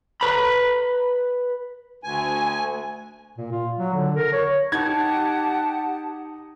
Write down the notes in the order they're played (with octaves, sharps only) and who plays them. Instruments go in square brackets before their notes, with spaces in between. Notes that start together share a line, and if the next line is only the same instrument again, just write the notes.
[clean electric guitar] B4 A#5 B5
[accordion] D2 G#5
[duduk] A#2
F4
F#3
D3
A#4
C#5
[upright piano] D#4 G#6 [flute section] G4 F#5 A5